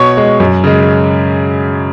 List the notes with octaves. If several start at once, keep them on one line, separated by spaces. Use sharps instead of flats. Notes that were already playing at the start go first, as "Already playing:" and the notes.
Already playing: B2 C#5 C#6
G#3
F#2
C#3 G#3